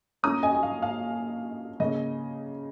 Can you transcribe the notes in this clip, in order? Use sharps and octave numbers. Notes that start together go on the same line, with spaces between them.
A#2 A#3 C#4 A#5 D#6
D#5 G#5
G#5
F5
F5
C#3 A#3 C#4 D#5